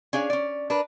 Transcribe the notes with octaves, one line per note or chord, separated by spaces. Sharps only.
C#4 D4 G#4 F5
C#4 D5
D4 A#4 B4